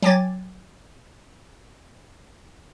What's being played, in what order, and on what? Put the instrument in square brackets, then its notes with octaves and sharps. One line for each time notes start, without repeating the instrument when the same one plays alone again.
[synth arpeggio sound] F#3 G5 G#5 D6 G#6 A6